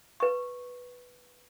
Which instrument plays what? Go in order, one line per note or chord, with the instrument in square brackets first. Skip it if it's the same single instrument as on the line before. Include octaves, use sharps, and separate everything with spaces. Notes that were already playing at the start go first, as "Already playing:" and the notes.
[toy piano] B4 C#6